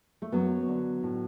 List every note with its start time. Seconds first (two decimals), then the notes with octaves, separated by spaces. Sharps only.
0.22 A3
0.32 F#2 F#3 B3
0.68 D3
1.03 A2